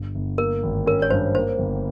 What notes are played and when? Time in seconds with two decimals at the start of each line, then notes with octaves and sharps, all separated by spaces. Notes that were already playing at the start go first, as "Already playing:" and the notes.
Already playing: G1 G2
0.15 G1
0.38 A#3 A#4
0.63 G#1
0.86 C#4 A#4
1.02 C#5
1.10 G2 C5
1.34 A#3 C5
1.59 G1